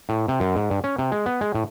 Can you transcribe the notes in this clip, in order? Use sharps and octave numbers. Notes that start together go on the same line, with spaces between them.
A2
C3
F#2
G#2
G2
C#4
C3
G#3
B3
G#3
A2